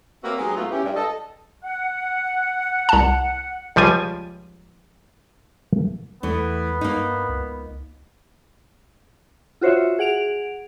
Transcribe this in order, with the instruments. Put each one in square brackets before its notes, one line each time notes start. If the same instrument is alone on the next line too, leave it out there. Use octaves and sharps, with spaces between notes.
[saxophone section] A#3 C4 F#4 B4 C#5 E5
F#3 G#3 B3 D#4 G4 G#4
G#2 F#3 A3 B3 F4
C#4 E4 G4
G2
A4 D#5
[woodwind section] F#5
[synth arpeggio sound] C2 A5
[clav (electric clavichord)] C#2 F3 G3 G#5
[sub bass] E2 [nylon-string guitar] E3 A3 [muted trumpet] B3
[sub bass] G2 [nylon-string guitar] A#3 D#4
[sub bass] C#2
[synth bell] F4 F#4 C5 C#5 E5
G#4 F#5 D7 F7